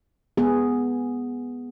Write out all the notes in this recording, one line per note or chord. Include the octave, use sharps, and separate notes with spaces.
B3 G#4